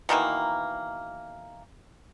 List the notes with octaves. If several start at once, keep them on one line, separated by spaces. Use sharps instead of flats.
B2 D#3 E3 A#3